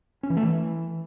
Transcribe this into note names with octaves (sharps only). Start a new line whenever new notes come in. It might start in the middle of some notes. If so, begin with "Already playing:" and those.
C#4
E3
A3
E3